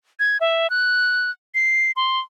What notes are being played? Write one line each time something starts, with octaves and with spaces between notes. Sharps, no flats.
G#6
E5
F#6
C7
C6